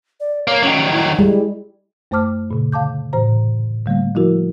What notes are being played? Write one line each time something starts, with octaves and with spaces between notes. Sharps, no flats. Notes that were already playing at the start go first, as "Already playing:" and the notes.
D5
A#3 C#5
D#3 F#3 C#4
E4
G3 G#3
F#2 A3 C5 A5 D6 F6
A#2 C#3
D3 F5 A5 D6 G6
A2 E3 C5 A#5
D3 G3 A3 A#3
F3 E4 F#4 A#4